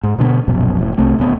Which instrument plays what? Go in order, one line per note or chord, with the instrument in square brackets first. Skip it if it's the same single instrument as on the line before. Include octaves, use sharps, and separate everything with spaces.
[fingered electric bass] G#2
B2 D3 A3 B3
D#1 A#1 F#2 B2
E1 A2
C2 A3 C4
D#1 D2 G#3 B3